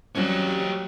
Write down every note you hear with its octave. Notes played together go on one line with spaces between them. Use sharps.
F#3 G3 C4 C#4 G4 C#5